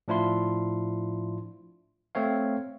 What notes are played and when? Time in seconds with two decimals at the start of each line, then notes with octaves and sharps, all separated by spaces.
0.08 A2 F3 D4 E4 F4 C6
2.15 A3 C4 C#5 F5